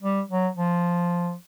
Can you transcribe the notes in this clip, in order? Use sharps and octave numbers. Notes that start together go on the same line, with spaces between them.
G3
F#3
F3